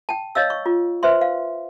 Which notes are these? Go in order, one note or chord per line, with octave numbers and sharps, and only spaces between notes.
G5 A5
C#5 D#5 F5 E6
C#6
F4
B4 C5 E5 C6
F5